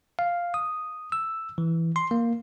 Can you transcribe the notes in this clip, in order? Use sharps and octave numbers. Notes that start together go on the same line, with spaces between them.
F5
D#6
E6
E3
C6
A#3